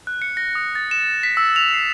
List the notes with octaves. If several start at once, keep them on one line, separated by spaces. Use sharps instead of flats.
F#6
C#7
A#6
D#6
A6
E7
B6
E6
F7
C7